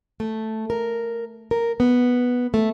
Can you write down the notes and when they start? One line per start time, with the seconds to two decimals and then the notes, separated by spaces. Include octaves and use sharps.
0.20 A3
0.70 A#4
1.51 A#4
1.80 B3
2.54 A3